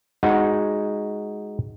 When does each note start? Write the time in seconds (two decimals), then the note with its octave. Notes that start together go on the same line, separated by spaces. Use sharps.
0.23 G#3 D#4 F#4 F#5